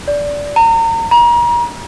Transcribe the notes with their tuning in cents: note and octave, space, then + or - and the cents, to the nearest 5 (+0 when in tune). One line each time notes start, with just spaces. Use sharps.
D5 -15
A#5 -35
A#5 +35